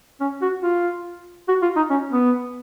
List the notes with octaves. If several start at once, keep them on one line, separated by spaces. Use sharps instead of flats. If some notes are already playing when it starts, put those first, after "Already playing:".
C#4
F#4
F4
F#4
F4
D#4
C#4
B3